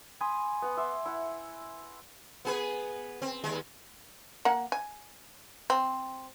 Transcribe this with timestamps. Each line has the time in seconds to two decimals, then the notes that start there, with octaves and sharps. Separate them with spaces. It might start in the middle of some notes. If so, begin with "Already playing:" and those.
0.21 G#5 B5 C6 D#6
0.62 B3 F#5
0.77 E5 C6 D6
1.06 E4 F#5
2.45 B3 G#4 B4
3.22 C4
3.44 D#2 G#3
4.45 A#3 F#5
4.72 G#5
5.70 C4